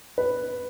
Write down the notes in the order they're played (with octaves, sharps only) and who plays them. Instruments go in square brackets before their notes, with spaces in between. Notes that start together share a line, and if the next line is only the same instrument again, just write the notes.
[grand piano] B4